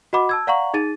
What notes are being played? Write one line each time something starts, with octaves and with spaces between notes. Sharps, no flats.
F#4 D#5 F#5 B5 D6
A5 E6 G#6
D5 F5 F#5 A#5 C#6 F#7
D#4 G#4 A6 D#7